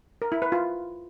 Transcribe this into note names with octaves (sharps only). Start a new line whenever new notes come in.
A#4
E4
B4
F4